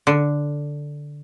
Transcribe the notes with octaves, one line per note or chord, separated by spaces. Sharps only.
D3